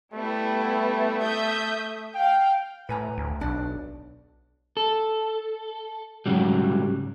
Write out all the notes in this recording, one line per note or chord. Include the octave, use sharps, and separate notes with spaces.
G3 A3 B3 E4
E5 D#6 G6
F5 G5
A2 B4 G#5 A#5
D2
B1 D4
A4
G#2 C#3 F#3 G3